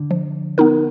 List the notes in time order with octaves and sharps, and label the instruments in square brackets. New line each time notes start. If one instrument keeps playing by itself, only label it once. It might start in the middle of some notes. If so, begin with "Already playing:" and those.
Already playing: [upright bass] D3
[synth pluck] F3
B3 D#4 A#4